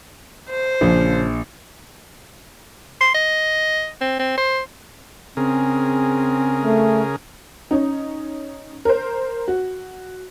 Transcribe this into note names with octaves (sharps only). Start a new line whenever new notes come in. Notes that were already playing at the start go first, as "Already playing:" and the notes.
C5
A#1 C#3 F3
C6
D#5
C4
C4
C5
C#3 C4 G#4 A#4
A3
C#4 D#4
A#4 C5
F#4